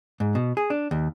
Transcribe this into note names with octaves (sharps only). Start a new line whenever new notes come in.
G#2
B2
G#4
D4
D#2